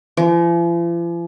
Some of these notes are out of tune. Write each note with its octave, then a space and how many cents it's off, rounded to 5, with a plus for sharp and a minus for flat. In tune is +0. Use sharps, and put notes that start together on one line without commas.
F3 -45